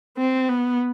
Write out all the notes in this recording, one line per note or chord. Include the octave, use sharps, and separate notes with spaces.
C4
B3